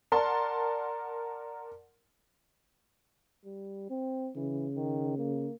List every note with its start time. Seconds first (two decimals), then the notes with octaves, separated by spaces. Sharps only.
0.12 A#4 D5 F#5 A5 C6
3.45 G3
3.90 C4
4.36 C#3 E3
4.76 D#3
5.18 A#3